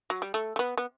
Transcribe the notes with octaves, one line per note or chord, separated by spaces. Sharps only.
F#3
G3
A3
A3
B3
B3